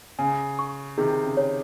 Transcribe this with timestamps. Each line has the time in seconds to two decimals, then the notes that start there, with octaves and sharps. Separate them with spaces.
0.19 C#3 G#5
0.59 C#6
0.98 C3 D#3 G#4
1.24 C#3
1.37 C#5